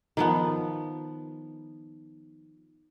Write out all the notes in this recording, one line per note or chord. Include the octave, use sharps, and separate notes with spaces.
D#3 F3 B3